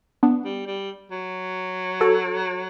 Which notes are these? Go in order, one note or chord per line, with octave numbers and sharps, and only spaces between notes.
B3 D4
G3
G3
F#3
F#4 A4